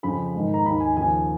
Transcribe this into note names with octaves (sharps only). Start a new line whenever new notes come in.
F2 C#3 F3 B5
G#2 D#3
A#5
D#2 D#3 B5
G#5
D#2 C#3 F3 G#5